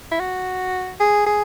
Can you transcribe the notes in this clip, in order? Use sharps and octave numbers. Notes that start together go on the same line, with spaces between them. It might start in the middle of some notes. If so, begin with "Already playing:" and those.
E4
F#4
G#4
G#4